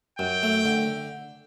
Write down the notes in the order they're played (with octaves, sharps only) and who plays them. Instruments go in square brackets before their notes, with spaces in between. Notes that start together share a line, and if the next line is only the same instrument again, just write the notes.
[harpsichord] F#2 [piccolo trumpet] G5
[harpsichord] A3
D3